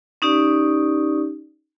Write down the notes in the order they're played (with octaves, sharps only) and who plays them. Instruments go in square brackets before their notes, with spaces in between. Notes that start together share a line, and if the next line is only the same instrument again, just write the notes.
[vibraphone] C#4 D#4 G4 D5